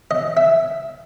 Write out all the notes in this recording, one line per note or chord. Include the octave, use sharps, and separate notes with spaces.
D#5
E5